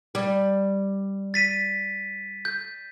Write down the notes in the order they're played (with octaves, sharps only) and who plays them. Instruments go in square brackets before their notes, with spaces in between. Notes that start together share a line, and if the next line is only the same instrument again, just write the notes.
[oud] G3
[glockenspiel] A6 B6 D#7
G6